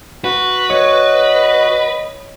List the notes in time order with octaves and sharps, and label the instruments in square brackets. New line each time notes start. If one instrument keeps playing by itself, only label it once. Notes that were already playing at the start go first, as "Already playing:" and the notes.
[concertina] F#4 [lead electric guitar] B4
[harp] C#5 [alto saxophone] D#5